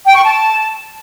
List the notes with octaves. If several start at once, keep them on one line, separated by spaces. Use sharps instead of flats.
G5
C#6
A5